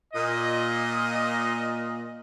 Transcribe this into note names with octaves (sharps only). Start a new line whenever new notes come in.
A#2 D#5